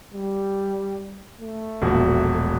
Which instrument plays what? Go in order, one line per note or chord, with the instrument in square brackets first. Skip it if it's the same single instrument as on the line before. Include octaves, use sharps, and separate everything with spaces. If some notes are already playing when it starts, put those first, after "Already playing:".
[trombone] G3
A3
[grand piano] E1 A#1 F#4